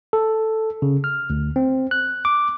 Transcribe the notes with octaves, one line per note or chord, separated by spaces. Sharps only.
A4
C#3
F6
D2
C4
F#6
D6